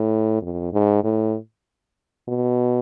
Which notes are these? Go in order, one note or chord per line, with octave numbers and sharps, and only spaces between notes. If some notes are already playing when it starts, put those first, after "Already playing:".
Already playing: A2
F2
G#2
A2
B2